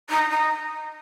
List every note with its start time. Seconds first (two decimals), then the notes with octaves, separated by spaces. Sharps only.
0.09 D#4
0.30 D#4